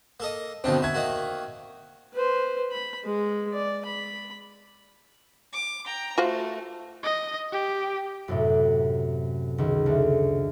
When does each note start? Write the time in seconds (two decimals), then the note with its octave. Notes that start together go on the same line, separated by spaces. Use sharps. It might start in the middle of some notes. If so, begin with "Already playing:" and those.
0.20 A#3 A4 D#5
0.64 B2 D3 D#3 F3 C4 D4
0.82 F#4 E5 G#6
0.94 D#3 A#3 F#4
2.14 B4 C5
2.72 B5
3.04 G#3
3.53 D5
3.86 B5
5.53 D6
5.85 G5 A#5
6.18 A3 F4 F#4 C5
7.03 D#5
7.52 G4
8.28 F#2 A2 C3
9.58 C#2 D#3
9.86 D2